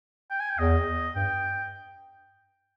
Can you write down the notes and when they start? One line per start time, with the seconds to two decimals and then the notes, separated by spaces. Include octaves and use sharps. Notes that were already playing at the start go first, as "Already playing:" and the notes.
0.30 G5
0.40 G#5
0.50 G5
0.59 E2 D#5
1.16 G2 G5